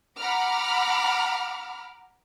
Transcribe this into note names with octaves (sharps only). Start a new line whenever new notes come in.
F#5 A#5 B5 D6 F6